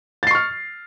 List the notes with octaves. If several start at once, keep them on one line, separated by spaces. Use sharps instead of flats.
C#6 F6 A6 C7